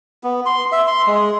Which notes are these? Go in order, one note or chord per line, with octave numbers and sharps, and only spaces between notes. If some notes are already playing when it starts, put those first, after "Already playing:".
B3
C6
E5
C6
G#3